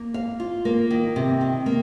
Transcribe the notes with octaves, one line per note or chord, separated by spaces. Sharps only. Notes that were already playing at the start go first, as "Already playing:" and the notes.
Already playing: A#3
F5
F4
A#3
D#3
C3
D#3
A#3